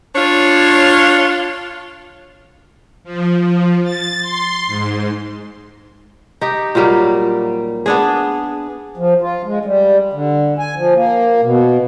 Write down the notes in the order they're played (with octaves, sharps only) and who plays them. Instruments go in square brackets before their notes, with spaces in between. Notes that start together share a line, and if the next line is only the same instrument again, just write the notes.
[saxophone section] D4 F4 C#5
[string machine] F3
F3
A6
C6
G#2
[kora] D#4 G4
A#2 F#3 G3 A#3
B3 D4 G#4
[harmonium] F3
F4
G#3
G3
D3
G#5
F3
A#3
B2